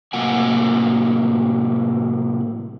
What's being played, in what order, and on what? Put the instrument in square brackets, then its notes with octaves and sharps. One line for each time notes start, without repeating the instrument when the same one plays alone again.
[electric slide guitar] A2 C3 F#3 A#3 F#5 G#5